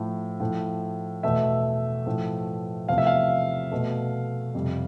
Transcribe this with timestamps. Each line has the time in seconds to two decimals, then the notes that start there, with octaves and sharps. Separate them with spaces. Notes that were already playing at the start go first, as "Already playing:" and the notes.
Already playing: A2 F3 A3
0.40 A2 F3 A3
1.23 E2 B2 A3 E5
2.06 A2 F3 A3
2.88 E2 C3 F3 A3 F5
2.98 E5
3.07 F5
3.71 B2 A3
4.55 F2 C3 G3